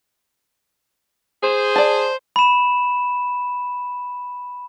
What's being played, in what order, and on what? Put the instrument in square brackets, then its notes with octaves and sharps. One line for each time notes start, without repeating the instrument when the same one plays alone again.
[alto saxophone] G#4 [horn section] C5
[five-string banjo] D5 A5
[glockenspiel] B5 E7